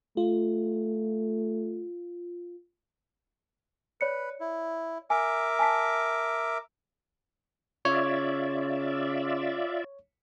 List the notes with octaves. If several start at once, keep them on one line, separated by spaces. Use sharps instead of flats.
A3 F4
B4 C#5 D5 C#7
E4
A#4 E5 G#5 D6
G#5 A5 B6
C#3 F4 C#5 D5 E5